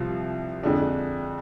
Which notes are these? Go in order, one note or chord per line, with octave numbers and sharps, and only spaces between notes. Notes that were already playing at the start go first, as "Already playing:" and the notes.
Already playing: C2 C3 F3
F2 D3 G#3 D4